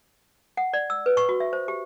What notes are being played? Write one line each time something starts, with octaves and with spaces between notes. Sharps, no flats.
F#5
D5
E6
B4
C#6
F#4
E5
C5
G4